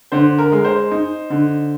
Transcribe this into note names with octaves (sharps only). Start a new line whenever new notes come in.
D3 C5
A#4
G#3
C5
D#4
D3